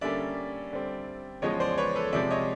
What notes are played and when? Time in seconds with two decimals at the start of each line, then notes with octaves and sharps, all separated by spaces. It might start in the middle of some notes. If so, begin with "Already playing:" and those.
0.01 D3 G3 A#3 C#4 D5 E5
0.72 D3 G3 C4
1.42 E2 C#3 F3 G#3 C#5 D#5
1.60 C5 D5
1.78 B4 C#5
1.95 A4 B4
2.13 C3 F3 G#3 D5 E5
2.31 C#5 D#5